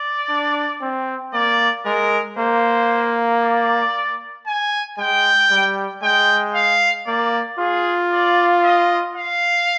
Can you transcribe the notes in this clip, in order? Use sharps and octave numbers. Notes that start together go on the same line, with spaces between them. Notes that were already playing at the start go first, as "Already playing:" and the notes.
Already playing: D5
D4
C4
A#3 D5
G#3 A#4
A#3 C5
D5
G#5
G#3 G5
G3
G#3 G5
F5
A#3 D5
F4 G#4
D5
D#5
F5